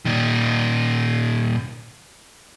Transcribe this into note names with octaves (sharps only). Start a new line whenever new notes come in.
A#2 D#3